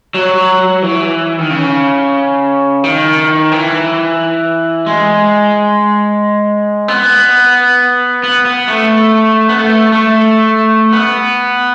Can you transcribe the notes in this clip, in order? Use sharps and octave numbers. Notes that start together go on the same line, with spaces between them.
F#3
E3
D#3
C#3
D#3
E3
G#3
B3
B3
B3
A3
B3
A3
A3
B3